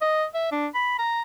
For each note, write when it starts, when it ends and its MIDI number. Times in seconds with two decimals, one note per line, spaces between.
0.01 0.25 75
0.34 0.48 76
0.52 0.67 62
0.75 0.95 83
0.99 1.22 82